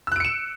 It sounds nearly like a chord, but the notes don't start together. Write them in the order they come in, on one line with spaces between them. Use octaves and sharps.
E6 F#6 D7 C#7 E7